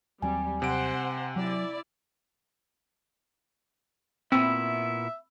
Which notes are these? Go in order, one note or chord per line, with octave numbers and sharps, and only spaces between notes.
D#2 F#3 G3 C4 G#5
C3 C5 F#5 D7
F#3 E4 D5
A#2 B3 C4 E4 E5 B5 E6